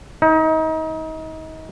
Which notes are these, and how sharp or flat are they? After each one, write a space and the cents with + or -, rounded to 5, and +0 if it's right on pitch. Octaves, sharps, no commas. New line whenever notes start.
D#4 +30